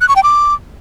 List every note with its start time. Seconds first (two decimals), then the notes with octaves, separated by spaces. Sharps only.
0.01 F#6
0.08 C#6
0.16 G5
0.23 D6